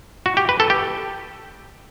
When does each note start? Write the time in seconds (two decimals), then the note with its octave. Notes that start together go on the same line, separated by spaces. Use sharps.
0.26 F#4
0.37 G4
0.49 B4
0.60 A4
0.70 G4